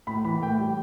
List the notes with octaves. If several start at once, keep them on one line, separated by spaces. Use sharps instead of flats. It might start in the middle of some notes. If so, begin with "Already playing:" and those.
A2 B5
E3 B5
A2 G5
G3